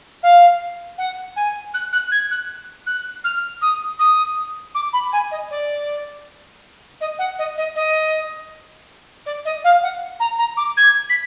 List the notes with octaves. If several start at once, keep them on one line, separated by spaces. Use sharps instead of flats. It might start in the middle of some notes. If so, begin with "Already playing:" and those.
F5
F#5
G#5
F#6
F#6
G#6
F#6
F#6
F6
D#6
D#6
D6
B5
G#5
D#5
D5
D#5
F#5
D#5
D#5
D#5
D5
D#5
F5
F#5
A#5
A#5
D6
G#6
B6